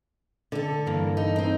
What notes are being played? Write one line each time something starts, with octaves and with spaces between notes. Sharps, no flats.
D3 A4
G2 E3 A#3
D#4
C4 D#4